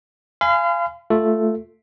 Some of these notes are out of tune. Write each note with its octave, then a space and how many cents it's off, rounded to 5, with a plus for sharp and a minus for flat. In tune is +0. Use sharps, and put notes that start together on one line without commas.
F5 -25 G#5 +0 B5 +45
A3 +0 F4 +0 A4 +0